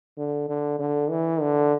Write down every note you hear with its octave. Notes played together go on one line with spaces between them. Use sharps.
D3
D3
D3
E3
D3